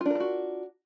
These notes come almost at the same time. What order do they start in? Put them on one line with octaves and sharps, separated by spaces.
F4 D4 A#4 A4 F#4